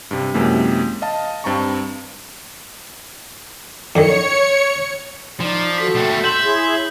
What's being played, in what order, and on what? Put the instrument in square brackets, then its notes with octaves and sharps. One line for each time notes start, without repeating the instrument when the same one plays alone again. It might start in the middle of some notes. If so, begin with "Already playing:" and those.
[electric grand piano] G2 C3
F#2 C3 E3 G#3 A#3
D#5 F5 A5
G2 C4 A5 A#5 C#6
[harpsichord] F2 D3 D#3 [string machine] C#5 C#7
[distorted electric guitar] F3 [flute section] D#4 [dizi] D5
[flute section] F#4 A4 [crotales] B6
[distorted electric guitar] B2 A3 [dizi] G5
[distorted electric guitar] E5 [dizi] C6 [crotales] G6 F#7
[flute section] E4 G#4 C#5